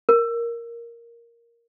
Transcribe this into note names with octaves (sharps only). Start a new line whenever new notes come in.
A#4